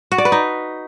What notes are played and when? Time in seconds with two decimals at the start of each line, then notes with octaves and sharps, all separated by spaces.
0.12 F#4
0.18 D5
0.25 B4
0.32 D#4